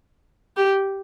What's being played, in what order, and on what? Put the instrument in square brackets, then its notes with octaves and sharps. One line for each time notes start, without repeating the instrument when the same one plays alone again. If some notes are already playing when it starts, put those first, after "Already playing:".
[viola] G4